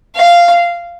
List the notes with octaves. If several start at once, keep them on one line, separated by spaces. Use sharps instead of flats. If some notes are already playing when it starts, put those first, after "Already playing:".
F5